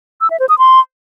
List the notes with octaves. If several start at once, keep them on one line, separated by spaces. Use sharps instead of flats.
E6
E5
C5
D#6
C6